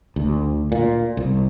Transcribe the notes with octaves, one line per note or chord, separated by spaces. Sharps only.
D2
A#2
C2